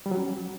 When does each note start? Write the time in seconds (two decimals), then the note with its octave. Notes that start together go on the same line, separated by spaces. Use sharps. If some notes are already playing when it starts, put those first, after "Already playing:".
0.06 G3
0.11 F#3
0.17 C#4